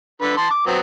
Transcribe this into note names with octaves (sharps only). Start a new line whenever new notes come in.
D3 B4
A5 C6
D6
F#3 B3 C4